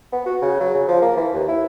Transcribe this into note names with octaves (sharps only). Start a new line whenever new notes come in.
B3
F#4
C#3
F#3
C#3
F3
A#3
E3
D#2
E4